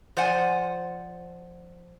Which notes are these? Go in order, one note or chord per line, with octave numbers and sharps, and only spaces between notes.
F3 C5 D5 F#5 G#5